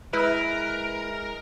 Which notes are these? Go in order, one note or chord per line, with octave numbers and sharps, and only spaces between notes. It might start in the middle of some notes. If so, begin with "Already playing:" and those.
G#3 E4 A#4 B4